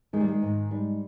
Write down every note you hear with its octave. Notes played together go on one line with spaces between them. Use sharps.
D#3 G#3
G3
G#3
G#2
G3